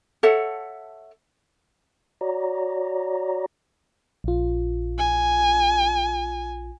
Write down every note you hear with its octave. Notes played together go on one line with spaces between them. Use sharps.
A4 C#5 E5 F#5
F#4 C#5 D5 A#5
A#1 F4
G#5